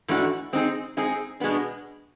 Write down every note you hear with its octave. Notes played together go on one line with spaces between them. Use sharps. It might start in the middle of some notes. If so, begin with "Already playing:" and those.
G#2 E3 A3 D4 F#4
G#3 C4 D#4 G#4
G#3 C4 D#4 G#4
B2 G#3 B3 D4